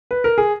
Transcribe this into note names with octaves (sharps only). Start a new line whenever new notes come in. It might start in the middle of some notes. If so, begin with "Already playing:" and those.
B4
A#4
G#4